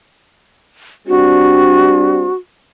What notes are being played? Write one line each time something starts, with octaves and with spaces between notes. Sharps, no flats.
G3 C4 D4 F#4